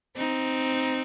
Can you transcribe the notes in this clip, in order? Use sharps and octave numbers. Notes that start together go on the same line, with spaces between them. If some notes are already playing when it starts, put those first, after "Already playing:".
C4 D#4